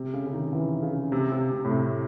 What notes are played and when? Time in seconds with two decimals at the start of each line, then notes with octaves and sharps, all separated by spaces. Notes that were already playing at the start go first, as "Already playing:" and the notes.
Already playing: C3
0.13 C#3
0.26 C#3
0.33 D#3
0.53 E3
0.82 C#3
1.12 C3
1.32 C3
1.51 C3
1.64 A2
1.71 C3